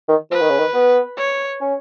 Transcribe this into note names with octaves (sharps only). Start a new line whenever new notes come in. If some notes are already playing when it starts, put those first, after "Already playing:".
D#3
F3 B4
D#3
C#3
D#3
B3
C#5
C#4